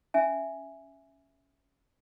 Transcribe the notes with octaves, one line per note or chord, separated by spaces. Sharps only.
C#4 E5 G#5